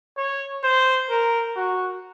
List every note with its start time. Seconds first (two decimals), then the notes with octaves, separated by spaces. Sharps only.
0.17 C#5
0.63 C5
1.10 A#4
1.56 F#4